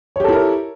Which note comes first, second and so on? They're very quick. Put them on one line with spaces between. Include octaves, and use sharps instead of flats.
C#5 G4 A4 E4 A#4